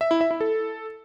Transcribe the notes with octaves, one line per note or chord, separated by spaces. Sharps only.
E5
E4
E5
E4
A4